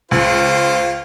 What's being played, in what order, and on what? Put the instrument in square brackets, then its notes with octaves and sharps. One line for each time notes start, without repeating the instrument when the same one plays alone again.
[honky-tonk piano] C#2 [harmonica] F4 C5